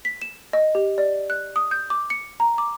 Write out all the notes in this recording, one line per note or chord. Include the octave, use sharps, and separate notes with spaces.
B6
E7
D#5
G4
D5
F#6
D#6
G6
D6
C#7
A#5
D6